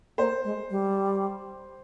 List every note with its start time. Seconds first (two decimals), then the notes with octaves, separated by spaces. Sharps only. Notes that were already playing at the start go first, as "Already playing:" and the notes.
0.18 A#3 C5
0.44 G#3
0.70 G3